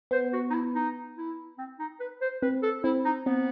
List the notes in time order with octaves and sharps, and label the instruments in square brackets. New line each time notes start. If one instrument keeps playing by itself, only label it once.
[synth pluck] B3 [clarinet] C5
[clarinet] F#4
D#4
E4
D#4
E4
C4
D#4
B4
C5
[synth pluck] C4 [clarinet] B4
[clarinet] A4
[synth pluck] C4 [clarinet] E4
[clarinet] D#4
[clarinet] B3 [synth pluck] C4